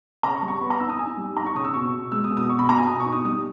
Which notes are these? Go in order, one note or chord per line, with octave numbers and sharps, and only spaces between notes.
C#3 A#5
C#6
G3
C#6
B3 B5
A#5
D#4 E6
D#6
D#4 G#5
G3
D#4 A#5
C#6
C#3 D#6
E6
B2 C#6
B2
G#3 E6
D#6
B2
D#6
B2 C#6
B5
B2 A#5
G#5
B2 D#6
C#6
D#4
D#6
G3 D#6